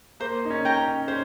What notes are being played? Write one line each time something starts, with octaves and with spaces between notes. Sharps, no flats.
A#3 C5
D#4
C#4
G5 A#5 C#6
C#4
C#4 C5